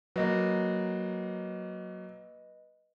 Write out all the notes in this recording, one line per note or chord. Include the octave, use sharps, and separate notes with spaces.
F#3 A#3 B4 D#5